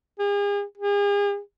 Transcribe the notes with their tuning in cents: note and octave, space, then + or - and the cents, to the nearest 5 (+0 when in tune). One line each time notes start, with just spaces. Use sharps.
G#4 -40
G#4 -40